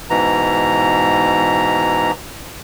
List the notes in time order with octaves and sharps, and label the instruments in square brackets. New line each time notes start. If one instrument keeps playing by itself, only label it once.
[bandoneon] G#2 B2 E3 A#5